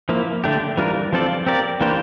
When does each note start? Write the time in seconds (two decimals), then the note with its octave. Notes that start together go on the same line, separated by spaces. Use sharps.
0.09 F3 A#3 E4
0.44 D3 A3 D4 G4
0.77 E3 G3 D4 F4 A#4
1.13 F3 C4 F4 A4 D5
1.46 C4 G4 A#4 D5
1.81 E3 A#3 D4 G4 C5